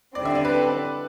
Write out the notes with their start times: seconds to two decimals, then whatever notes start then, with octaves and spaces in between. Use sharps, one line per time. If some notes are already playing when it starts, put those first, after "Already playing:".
0.15 D3 G3 C4 D5
0.25 E5
0.35 D5
0.45 B4
0.54 A4